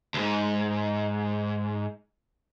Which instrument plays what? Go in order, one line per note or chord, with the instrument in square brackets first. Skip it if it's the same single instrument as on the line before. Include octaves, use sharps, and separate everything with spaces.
[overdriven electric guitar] D2 G#2